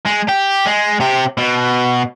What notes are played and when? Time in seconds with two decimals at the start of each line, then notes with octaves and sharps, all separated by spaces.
0.06 G#3
0.29 G4
0.66 G#3
1.00 C3 G4
1.38 B2